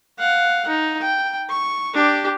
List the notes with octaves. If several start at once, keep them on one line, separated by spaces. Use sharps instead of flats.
F5 F#5
D#4
G5
C#6
D4 G4